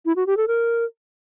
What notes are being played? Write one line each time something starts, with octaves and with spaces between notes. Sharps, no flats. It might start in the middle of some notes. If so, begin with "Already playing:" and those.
E4
F#4
G4
A4
A#4